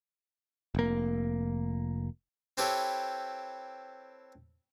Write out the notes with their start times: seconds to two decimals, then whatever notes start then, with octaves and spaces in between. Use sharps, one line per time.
0.75 F1 A#3
2.57 C4 E4 G4 A4 B4 C#5